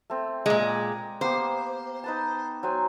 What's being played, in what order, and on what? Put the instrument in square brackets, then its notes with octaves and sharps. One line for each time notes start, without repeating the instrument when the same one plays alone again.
[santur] A3 C4
[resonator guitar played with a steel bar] A#2 G#3 [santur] D5 A#5
[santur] A#3 B3 G4 [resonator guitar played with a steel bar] C5
[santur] D#4 B4 A5
F#3 C5 G#5